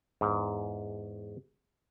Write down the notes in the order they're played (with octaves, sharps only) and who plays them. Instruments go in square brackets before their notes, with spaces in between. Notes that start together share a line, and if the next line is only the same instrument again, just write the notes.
[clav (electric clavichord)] E2 G#2